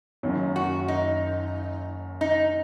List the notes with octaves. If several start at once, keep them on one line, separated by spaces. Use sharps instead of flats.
F#1 F#2 D#3 F#3
F#4
D#4
D#4